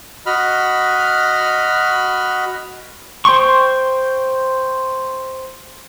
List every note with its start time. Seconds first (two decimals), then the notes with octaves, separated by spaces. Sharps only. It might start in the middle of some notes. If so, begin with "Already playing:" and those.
0.26 F#4 D#5 B5 F6
3.25 C5 G5 C6 C#6